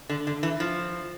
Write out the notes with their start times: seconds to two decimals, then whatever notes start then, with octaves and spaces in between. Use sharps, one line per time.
0.09 D3
0.27 D3
0.43 E3
0.60 F3